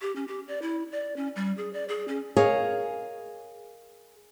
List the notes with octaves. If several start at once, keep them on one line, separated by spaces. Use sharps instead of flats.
G4
C#4
G4
D5
E4
D5
C#4
G3
G#4
D5
G#4
C#4
G#4 A#4 C#5 D#5 F5 G#5